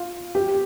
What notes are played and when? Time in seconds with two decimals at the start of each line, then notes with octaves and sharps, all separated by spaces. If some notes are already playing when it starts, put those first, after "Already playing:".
Already playing: F4
0.35 G4